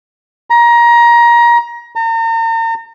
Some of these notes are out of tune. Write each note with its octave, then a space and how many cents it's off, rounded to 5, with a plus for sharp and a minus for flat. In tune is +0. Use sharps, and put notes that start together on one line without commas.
A#5 +25
A#5 -40